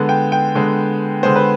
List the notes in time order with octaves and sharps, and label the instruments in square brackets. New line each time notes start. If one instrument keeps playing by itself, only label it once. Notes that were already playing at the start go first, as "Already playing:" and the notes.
Already playing: [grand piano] D3 G#3 B3
G5
G5
D3 G#3 B3
D3 G#3 B3 C5
B4